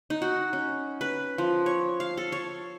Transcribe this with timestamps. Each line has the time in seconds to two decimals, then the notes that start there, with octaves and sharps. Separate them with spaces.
0.10 D#4
0.22 F#4
0.53 C#4
1.01 B4
1.38 F3
1.66 C#5
2.00 F5
2.17 A4
2.32 C#5